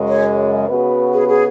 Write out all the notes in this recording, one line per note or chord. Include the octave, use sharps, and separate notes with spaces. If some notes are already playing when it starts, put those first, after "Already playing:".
Already playing: F#2 C#3 G#3
C#5
C#3 B3 F#4 B4
G#4
G#4